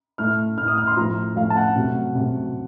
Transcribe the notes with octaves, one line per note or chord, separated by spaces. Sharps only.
A2 A3 F6
A2 A3 F6
D#6
F6
C6
A2 F3 A3 A#5
A2 F3 A3 F5
A5
F#5
C3 F#3 A3
C3 F#3 A3